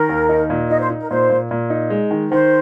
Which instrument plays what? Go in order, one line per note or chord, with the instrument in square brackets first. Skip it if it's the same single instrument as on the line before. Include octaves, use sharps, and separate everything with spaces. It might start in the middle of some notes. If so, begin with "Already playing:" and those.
Already playing: [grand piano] D#3 [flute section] A#4
[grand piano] D#2
D#4
A#2
[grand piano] D#4 [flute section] D#5
[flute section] C5
[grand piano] D#4
[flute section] A#4
[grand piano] A#2 [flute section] C5
[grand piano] A#2
A#2
D#4
G#3
D#3
[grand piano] D#3 [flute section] C5